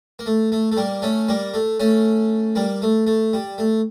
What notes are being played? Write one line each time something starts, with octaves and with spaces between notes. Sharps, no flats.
A#3
A3
A3
A3
G3 A#3
A3 C#4
G3 A#3
A3
A3 C#4
G3 A#3
A3
A3
G3
A3